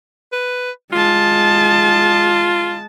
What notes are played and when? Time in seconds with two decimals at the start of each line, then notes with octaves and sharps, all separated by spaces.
0.33 B4
0.93 G#3 F4 A5